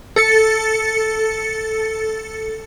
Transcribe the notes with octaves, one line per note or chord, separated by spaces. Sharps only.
A4 A6 C#7